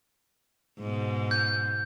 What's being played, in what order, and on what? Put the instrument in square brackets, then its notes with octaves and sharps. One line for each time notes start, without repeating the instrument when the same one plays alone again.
[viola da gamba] G#2 B2
[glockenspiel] G6